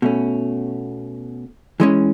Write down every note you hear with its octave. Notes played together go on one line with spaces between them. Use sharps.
B2 A3 C#4
E3 G#3 C#4